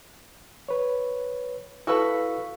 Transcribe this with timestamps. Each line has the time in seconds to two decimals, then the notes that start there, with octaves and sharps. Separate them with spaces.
0.69 B4 C#5
1.87 E4 F#4 A4 B4 F5